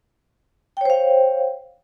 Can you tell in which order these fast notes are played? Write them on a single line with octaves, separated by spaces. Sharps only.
G5 C#5 C5 F5